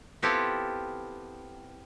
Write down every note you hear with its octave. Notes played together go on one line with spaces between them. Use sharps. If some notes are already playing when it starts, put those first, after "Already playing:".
B3 C4 E4 F4 G4 A4